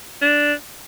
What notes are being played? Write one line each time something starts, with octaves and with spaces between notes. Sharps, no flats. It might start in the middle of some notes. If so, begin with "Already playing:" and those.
D4